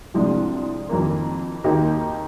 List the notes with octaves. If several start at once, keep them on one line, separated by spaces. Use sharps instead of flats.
C2 C3 F3 G#3 D4
F2 D#3 A#3
D#2 D#3 A#3 D#4 G4